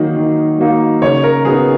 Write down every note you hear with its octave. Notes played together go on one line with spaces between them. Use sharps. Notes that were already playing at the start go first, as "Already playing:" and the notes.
Already playing: D#3 F#3 A#3 D#4
D#3
F#3 A#3 D#4
C#3 C#5
A#4
F#3 B3 D#4 G#4